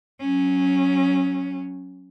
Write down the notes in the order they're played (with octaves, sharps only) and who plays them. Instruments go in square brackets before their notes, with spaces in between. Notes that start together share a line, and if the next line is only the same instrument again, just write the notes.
[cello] F#3 C#4